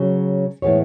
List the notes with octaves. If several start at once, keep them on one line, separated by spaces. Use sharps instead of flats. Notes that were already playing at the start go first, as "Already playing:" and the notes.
Already playing: C#3 F#3 C#4
A2 E3 G#3 B3 C#5